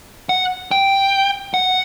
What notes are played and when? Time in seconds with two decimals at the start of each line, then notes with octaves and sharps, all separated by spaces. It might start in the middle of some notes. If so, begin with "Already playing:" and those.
0.29 F#5
0.71 G5
1.54 F#5